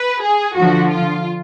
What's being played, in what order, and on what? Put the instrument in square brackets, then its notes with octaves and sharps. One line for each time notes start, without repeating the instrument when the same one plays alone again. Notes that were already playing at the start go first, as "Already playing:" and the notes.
Already playing: [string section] B4
G#4
D3 F3 F#4
F4